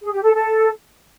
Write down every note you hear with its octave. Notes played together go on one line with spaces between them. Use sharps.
G#4
G4
A4
A4